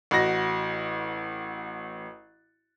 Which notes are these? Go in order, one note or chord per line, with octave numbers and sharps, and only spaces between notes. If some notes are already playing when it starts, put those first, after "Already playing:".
A1 F#4 A#6